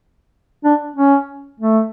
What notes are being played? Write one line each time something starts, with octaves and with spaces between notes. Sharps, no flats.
D4
C#4
A3